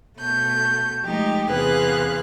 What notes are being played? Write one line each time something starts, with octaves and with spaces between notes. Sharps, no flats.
B2 A3 G6
F3 G#3 A3 D#4 G4
E2 C3 G#4 B4 F5 F#6